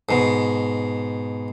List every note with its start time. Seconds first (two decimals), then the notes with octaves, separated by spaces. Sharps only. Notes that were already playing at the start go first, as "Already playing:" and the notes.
0.09 G#2 B2